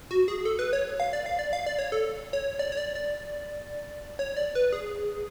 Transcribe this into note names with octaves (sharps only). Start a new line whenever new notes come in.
F#4
G#4
A4
B4
C#5
F5
D5
F5
D5
F5
D5
C#5
A4
C#5
D5
C#5
D5
D5
C#5
D5
B4
G#4